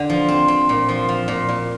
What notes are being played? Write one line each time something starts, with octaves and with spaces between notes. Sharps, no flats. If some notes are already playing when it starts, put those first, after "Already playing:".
Already playing: D3
F3
C4
C4
A#2
F3
F3
A#2
A#2